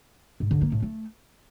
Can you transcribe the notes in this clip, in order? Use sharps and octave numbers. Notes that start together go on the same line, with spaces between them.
G#2
D3
A#3
A2
A3